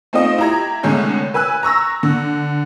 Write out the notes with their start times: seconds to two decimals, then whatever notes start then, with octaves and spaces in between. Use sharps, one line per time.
0.13 A3 C4 D#4 F4 D#5
0.38 E4 G4 A#5 G#6
0.83 C2 D3 G#3 A3 C#4 G6
1.34 B4 G#5 E6 F#6
1.63 A#5 C#6 E6 A#6
2.03 D3